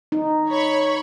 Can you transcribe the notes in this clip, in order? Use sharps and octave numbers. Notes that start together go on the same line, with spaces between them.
D#4
C#5 B5 C#6